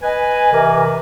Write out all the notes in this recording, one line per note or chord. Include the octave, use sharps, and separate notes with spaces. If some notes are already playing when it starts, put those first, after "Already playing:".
B4 D#5 G#5
C3 E3 A#4